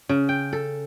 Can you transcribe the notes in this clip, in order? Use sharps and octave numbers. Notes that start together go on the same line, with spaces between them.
C#3
G5
A4